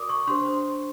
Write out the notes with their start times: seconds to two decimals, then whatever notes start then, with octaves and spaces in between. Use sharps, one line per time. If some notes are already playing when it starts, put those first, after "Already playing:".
Already playing: F#4 A#4 D5 D6 D#6
0.09 C#6
0.27 D4 G4 C5 C6